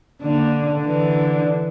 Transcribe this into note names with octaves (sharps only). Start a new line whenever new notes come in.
D3 A#3
D3 E3